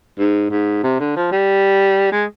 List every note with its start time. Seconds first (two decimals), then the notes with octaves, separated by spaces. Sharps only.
0.19 G#2
0.51 G#2
0.83 C3
1.00 D3
1.16 F3
1.32 G3
2.12 G#3